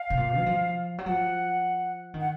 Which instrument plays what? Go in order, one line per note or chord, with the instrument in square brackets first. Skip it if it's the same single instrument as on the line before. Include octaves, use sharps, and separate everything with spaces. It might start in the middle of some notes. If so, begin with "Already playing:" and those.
Already playing: [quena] F5
[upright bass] C3
A#2
F#3
F3
F#3
[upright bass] F3 [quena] F#5
[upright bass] D#3
[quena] F#5